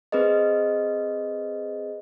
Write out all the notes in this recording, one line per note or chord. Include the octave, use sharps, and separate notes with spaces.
C4 G#4 B4 C5 D#5